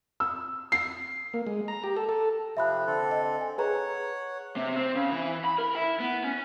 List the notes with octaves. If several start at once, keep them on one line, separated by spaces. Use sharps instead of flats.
E6
C7
A#3
G#3
A#5
G4
A4
A4
C3 F3 C4 E5 B5 F#6
D3 C4 A4
D#5
G#5
G#4 B4 C#5 F#5 A#5
C3
C4
C#3
E3
B5
A#4
E4
B3
C#4